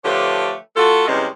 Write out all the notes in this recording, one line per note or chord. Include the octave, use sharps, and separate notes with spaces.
D3 F3 A3 G4 B4 C#5
A3 F4 F#4 A4
E2 C3 G3 G#3 C#4 C5